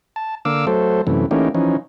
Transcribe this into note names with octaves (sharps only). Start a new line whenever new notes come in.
A5
D3 A#3 F5 D6 E6
F#3 A3 A4 C5
F#2 C3 E3 A3
E3 A3 A#3 C#4 D#4 G4
E3 F3 C#4 D#4